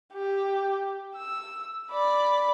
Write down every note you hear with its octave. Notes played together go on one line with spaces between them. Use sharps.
G4
E6
D5 B5